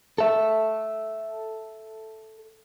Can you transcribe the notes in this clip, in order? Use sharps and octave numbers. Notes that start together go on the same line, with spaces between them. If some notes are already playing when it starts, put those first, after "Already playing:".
A4 E5